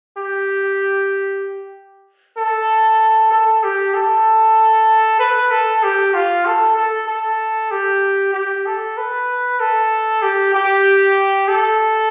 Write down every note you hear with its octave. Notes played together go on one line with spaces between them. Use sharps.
G4
A4
A4
G4
A4
B4
A4
G4
F4
A4
A4
A4
G4
G4
A4
B4
A4
G4
G4
A4